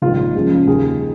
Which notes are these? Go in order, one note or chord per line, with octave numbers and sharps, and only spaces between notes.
A#1 G#2 D#3 F4
C#2 C#3 F3
D#2 D#3 G#4